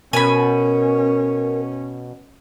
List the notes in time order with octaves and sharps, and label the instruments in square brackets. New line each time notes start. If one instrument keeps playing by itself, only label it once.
[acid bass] B2 [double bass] C#4 [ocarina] A#4 [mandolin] G#5 B5